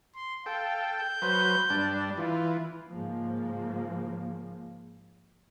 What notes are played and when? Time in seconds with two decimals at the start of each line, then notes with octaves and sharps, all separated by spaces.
0.15 C6
0.46 A4 F5 G5
0.86 G6
1.22 F#3 B4 C5
1.70 G2 D4
2.17 E3 F4
2.88 G#2 C#3 F3 A#3